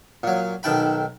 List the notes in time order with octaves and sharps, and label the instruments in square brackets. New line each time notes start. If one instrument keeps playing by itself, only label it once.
[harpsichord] A#2 F#3
B1 D#3 A4 G5 B5